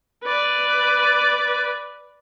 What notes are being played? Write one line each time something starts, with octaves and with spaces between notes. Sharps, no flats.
B4 D5